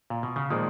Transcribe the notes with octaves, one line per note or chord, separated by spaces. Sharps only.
A#2
B2
C#3
A#2 D#3 F3 G#3